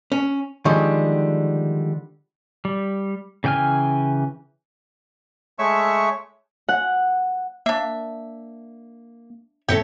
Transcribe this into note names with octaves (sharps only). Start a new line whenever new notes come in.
C#4
D3 D#3 F3 G3 G#3
G3
C#3 E3 G5 G#5 F6
G#3 A3 C#5 E5 C#6 E6
F#5
A#3 D4 E5
G#1 A4 C#5 E5 G5 C#7